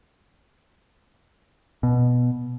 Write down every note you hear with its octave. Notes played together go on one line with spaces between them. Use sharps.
B2